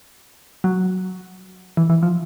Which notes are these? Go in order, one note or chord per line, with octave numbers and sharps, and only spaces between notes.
F#3
E3
E3
F3